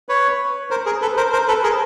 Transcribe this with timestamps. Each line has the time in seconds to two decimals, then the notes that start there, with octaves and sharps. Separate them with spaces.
0.09 B4 C#5
0.71 A#4 C5
0.86 G#4 A#4
1.02 A4 B4
1.17 A#4 C5
1.32 A#4 C5
1.48 A4 B4
1.63 G#4 A#4